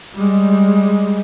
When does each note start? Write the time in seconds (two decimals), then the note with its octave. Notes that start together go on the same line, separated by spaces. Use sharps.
0.15 G3 G#3